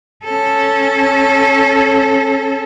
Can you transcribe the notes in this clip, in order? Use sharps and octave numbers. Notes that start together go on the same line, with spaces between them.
C#4 A4